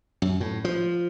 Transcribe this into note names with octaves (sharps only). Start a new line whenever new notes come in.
F#2
A2
F3